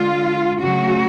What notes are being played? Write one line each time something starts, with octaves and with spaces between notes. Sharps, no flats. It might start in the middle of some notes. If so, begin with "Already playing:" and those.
Already playing: D3 G#3 F4
C#3 F#3 A3 F#4